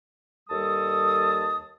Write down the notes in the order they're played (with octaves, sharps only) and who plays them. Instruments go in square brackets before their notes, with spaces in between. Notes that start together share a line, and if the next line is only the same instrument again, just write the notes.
[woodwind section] D#2 G3 A4 A5 D#6